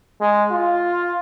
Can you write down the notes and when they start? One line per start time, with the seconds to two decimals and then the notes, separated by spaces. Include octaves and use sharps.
0.21 G#3
0.51 F4